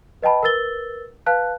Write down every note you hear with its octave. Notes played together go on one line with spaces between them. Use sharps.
B4 D#5 G5 A5 B5
A#4 B4 E6 A6 G7
B4 F5 A5 F#6